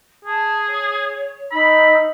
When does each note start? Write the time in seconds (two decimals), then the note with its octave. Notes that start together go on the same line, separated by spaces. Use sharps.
0.25 G#4 A5
0.67 C#5
1.51 D#4 B5 E6